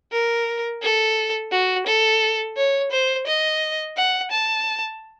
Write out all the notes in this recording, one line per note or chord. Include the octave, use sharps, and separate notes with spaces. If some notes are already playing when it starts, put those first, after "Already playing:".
A#4
A4
F#4
A4
C#5
C5
D#5
F#5
A5